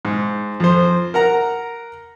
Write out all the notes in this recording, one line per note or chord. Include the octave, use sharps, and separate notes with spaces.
G#2
F2 C5
A#4 F#5 A#5